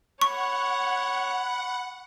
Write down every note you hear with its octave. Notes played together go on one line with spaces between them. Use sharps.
C#5 F#5 B5 C#6